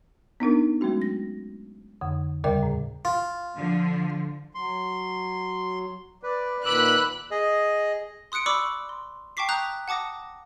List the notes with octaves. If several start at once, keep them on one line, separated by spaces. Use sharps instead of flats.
B3 D4 D#4 A#4
F#3 G#3 A3 C#4 F#4
A#6
F2 D3
D#2 C#3 G3 A#4 D5 G5
A2
F4
D3 F3
F#3 C6
B4 D5
A#2 D#3 B4 B5 D6 E6 F#6
G#4 D#5
C6 D#6 F#6 C#7 D7
D5 B5 C#6 D6 E6
C6
G5 A5 C#6 D6 B6 C7
A#5 D#6 F#6 G6 F7
F#5 A5 D6 D#6 A#6